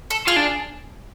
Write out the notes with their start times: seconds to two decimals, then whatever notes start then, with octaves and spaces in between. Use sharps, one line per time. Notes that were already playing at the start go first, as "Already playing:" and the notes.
0.10 A4
0.27 F4 G#4
0.36 D4